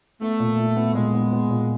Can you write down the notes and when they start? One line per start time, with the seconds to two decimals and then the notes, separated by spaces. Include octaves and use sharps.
0.21 A3 B3
0.39 A#2
0.58 A#2
0.76 B3
0.94 A#2 G#3
1.14 B3
1.32 B3
1.50 A#2